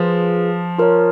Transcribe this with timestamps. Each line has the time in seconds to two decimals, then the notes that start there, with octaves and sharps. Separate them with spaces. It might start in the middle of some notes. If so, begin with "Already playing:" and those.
Already playing: F3 F4 G#4 B4 F5
0.78 F4 A#4 C#5